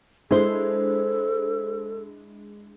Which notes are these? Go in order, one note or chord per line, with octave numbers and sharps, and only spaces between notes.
G#3 D4 E4 G#4 A4 C5